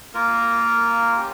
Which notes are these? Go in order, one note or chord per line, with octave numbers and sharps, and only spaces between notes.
A#3 F4 A#4
C#4 F4 G4